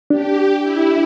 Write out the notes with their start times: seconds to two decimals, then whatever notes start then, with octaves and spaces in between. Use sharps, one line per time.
0.10 D4 G4
0.62 E4